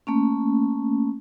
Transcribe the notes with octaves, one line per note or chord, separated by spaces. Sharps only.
A3 A#3 C#4